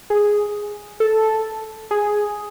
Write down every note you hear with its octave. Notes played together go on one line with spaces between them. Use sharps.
G#4
A4
G#4